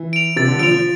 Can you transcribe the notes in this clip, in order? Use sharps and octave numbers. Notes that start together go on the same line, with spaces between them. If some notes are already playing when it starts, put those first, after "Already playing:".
Already playing: E3
D7 F7
C3 A6
D3
F3 D7 F7
F3